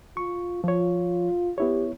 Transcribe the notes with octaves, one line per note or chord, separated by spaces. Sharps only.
F4 C#6
F3 F4 C#5
B3 E4 G4 C#5